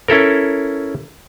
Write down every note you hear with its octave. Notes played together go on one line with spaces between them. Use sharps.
C#4 E4 A4 A#4